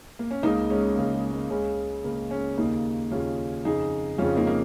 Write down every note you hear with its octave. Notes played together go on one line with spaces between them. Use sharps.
A#3
C#4
C#2 C#3 A#3 D#4
G#3 C#4
C#2 C#3 A#3
G#3
A#3
C#2 C#3 G#3 C#4
C#2 C#3 A#3
G#3 C#4
D#2 C#3 A#3 D#4
D#2 C#3 C#4 F4
F2 C#3 D#4 G#4
F2 C#3 C#4 F4
A#3 D#4
A#3